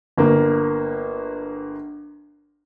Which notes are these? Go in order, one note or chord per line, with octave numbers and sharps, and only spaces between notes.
G1 A#3